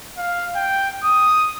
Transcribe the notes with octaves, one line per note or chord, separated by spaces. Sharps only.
F5
G5
D#6